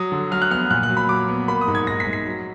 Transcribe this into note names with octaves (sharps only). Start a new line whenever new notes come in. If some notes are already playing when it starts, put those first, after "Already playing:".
Already playing: F#3 D#6
D3
F#3 F6
F#6
B3 F6
A#2 F#6
F#6
F#3
B5
F#3 D6
B3
A#3 B5
D#6
G#2
G#6
G#2 A#6
B6
G#2
B6
F#3